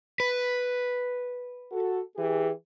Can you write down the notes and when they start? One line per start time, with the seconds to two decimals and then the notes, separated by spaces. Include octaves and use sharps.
0.20 B4
1.72 F#4 A4
2.16 E3 G4 G#4